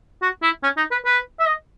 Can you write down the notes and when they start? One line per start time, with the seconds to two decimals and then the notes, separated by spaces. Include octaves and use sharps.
0.22 F#4
0.43 E4
0.63 C#4
0.77 D#4
0.91 B4
1.05 B4
1.40 E5
1.46 D#5